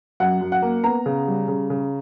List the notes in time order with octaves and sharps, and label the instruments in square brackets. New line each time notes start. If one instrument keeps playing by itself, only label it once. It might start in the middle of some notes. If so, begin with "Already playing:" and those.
[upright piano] F#2 F#5
F#2
F#5
A#3
B3 A#5
C#3
G3
C#3
C#3